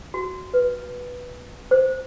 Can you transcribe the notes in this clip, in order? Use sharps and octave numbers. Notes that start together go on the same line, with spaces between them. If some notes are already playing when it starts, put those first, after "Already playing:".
F#4
B4
C5